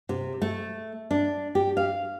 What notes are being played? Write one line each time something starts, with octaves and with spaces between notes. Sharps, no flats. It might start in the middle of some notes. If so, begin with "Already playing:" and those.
C3
A3
D4
G4
F5